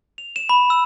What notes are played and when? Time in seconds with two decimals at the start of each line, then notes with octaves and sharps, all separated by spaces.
0.18 F7
0.36 E7
0.49 B5
0.70 E6